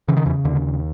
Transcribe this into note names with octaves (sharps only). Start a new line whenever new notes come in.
C#3 E3
D#3
E2 E3
D#2 D3